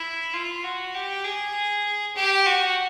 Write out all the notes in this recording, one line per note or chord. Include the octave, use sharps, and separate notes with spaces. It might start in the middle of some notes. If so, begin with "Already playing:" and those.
Already playing: E4
F4
F#4
G4
G#4
G4
F#4